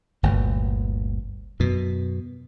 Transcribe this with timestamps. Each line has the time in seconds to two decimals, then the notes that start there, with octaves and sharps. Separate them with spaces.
0.23 G1 D2 A#2
1.60 F#2 B2